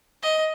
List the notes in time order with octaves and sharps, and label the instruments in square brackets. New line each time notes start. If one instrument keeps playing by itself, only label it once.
[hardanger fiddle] D#5